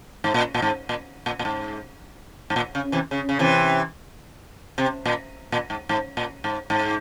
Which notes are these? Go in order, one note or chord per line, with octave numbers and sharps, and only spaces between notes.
G#2
A#2
A#2
G#2
A#2
A#2
A#2
G#2
G#2
A#2
C#3
C3 E3
C#3
C#3
C3 E3
C3
A#2
A#2
G#2
G#2
A#2
G#2
G#2